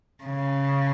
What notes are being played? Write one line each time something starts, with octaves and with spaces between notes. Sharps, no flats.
C#3